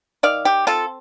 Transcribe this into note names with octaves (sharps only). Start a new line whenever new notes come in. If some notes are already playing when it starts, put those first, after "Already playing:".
D#3 D5 F5
G4
C4 F4 A4